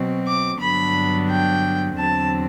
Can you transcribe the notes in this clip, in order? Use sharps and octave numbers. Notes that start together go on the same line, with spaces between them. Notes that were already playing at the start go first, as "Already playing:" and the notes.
Already playing: B2 F#3 C4
D6
G2 D3 F#3 B3 D4 B5
G5
E2 D3 F#3 C4 A5